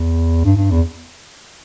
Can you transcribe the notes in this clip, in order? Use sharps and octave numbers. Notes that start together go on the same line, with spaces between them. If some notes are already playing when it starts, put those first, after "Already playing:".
Already playing: E2
G2
G2
E2